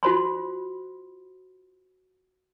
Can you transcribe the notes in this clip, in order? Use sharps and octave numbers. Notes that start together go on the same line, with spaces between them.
F4 F#4 C5 B5 C6